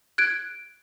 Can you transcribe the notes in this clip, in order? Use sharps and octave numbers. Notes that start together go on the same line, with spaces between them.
F#6 G#6 D7